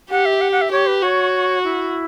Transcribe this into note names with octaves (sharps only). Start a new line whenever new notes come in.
G4 F#5
E5
F#5
F#5
E5
G4 C#5
B4
F#4 C#5
E4